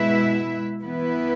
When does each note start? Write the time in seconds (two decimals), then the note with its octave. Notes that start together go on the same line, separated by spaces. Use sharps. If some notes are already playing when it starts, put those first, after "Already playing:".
Already playing: B2 G#3 E4 B4 E5
0.82 E3 B3 E4 B4